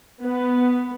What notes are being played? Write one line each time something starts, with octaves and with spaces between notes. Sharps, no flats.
B3